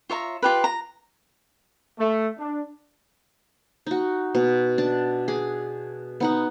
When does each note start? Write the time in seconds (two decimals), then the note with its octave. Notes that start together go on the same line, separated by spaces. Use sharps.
0.10 F4 C#5 E5 A#5
0.42 F4 G4 B4
0.64 A#5
1.98 A3
2.38 D4
3.87 D#4 F#4
4.35 B2
4.78 D4 A5 D6
5.28 G#4 D6
6.20 B3 D#4 F#5